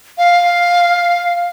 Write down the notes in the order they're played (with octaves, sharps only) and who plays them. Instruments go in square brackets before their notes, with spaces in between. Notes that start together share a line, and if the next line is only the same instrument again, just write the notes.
[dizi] F5